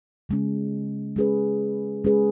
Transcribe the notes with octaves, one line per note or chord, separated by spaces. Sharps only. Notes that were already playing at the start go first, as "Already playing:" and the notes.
C#3 G#3 C#4
G#3 C#4 G#4 B4
G#3 C#4 G#4 B4